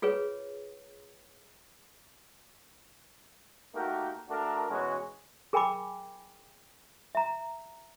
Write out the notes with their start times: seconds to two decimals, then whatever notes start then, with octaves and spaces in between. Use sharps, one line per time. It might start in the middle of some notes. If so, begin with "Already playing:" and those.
0.02 F4 G#4 B4 C#5
3.75 A3 A#3 D#4 F#4 G4 A#4
4.30 A3 D4 F#4 A4 A#4
4.71 B2 E3 G#3 C#4 F#4
5.53 G#4 A#4 G5 G#5 B5 D6
7.15 E5 A#5